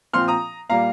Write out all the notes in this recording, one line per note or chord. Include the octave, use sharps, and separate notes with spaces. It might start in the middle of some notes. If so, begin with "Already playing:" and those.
A#2 F3 C4 C6 F6
A#5 D#6
A#2 G3 A#3 F5 A#5